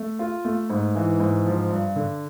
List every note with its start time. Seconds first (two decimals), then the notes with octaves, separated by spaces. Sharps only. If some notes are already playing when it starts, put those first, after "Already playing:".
Already playing: A3
0.19 F4
0.45 A3
0.70 G#2
0.95 E3
1.20 G#2
1.46 F3
1.71 G2
1.96 D3